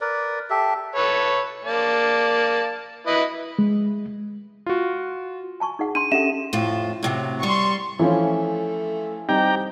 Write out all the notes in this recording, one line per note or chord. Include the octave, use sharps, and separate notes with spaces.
A#4 B4 D5
G4 A4 E5
A4 B4 C#5
A#3 D5 A5
E4 B4 D#5
G#3
F4 F#4
G#5 A5 C#6
D#4 G#4 F#5
D4 C6 D#7
C#4 G4 A4 E5 F#5 E7
F2 A2 F4
A2 C3 F#3
G3 C6 C#6
E3 F3 A3 C#4
G3 C4 D#4 G4 G5 A#5